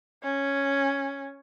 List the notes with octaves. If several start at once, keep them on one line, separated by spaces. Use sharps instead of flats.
C#4